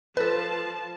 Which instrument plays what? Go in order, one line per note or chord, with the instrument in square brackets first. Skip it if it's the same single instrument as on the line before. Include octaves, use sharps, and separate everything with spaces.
[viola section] F3 A5 [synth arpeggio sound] A4 B4